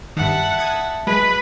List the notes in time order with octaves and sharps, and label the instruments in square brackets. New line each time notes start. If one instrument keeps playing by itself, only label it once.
[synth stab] G2 D#3 [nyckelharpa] E5 A5 [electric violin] F#5
[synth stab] D#6 G#6
[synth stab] F#3 G#3 D#5 [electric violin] B4 [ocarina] B5